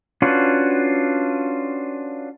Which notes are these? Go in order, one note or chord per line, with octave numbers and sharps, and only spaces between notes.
C#4 D4 F4 F#4 B4